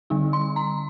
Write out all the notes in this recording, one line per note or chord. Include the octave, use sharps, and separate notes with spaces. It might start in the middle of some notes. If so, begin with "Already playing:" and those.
D3 G3 C4 D#4
C6
A#5